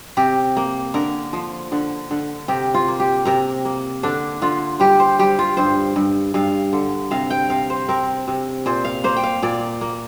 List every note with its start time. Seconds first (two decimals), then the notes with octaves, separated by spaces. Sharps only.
0.17 C3 G4
0.57 A#3
0.94 D3 A#4
1.33 F3
1.72 D3
2.11 D3
2.48 C3 G4
2.74 F4
2.88 A#3
3.00 G4
3.25 C3 A#4
3.65 A#3
4.03 D3 D4
4.42 D3 F4
4.80 G3 G4
5.00 C5
5.19 G3 G4
5.39 F4
5.57 G2 C5
5.96 G2
6.34 G2 F5
6.73 D3
7.11 C3 F5
7.30 G5
7.50 C3 F5
7.70 C5
7.89 C4 A#4
8.28 C3
8.66 A#2 C5
8.85 F5
9.04 A#3 C5
9.16 G5
9.23 F5
9.42 A#2 D5
9.81 A#3